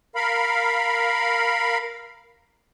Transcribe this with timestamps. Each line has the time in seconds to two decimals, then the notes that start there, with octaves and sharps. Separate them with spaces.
0.15 A#4 F5 B5